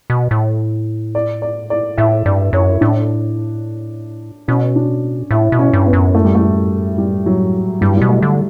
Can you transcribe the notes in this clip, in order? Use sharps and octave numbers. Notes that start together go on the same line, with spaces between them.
B2
A2
D5
D5
D5
A2 E5
G2 D5
F#2 C#5
E4
A2 D4
B2 C#4
D4
A2 E4
B2
C#4
G2
B3
F#2
A3
G3
A3
G3
F#3
G2 G3
F#3
B2 G3
A3
D3